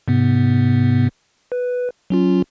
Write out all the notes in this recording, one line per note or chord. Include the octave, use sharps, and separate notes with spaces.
G#2 C3 B3
B4
F#3 C#4 F4